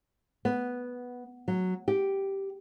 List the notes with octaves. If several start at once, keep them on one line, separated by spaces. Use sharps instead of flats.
B3
F#3
G4